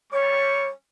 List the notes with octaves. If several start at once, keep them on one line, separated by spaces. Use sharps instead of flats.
G3 C#5 C#6